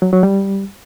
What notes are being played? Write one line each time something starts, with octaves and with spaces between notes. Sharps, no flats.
F#3
F#3
G3